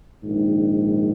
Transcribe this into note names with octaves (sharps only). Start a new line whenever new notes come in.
A#1 G#2 D#3